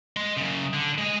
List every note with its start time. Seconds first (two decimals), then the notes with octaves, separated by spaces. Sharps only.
0.17 D#5 C6
0.37 F#2 C#3
0.73 D3
0.98 G#3 D#5